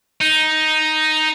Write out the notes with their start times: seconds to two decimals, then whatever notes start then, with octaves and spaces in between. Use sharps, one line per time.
0.21 D#4